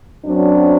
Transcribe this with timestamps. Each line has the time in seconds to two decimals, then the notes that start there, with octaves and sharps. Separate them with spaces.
0.24 F#2 F#3 C4 D4